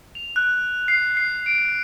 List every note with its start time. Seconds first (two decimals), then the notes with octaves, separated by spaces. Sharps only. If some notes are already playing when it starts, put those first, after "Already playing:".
0.15 F7
0.36 F#6
0.88 C7
1.17 C7
1.46 D7